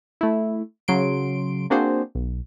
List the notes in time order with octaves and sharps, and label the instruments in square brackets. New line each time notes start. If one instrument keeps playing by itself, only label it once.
[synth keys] A3 E4
C#3 F#3 C6 D7
A#3 C4 D4 F#4 G#4 C5
B1